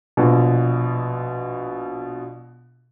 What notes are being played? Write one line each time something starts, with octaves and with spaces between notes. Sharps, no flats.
A#1 B2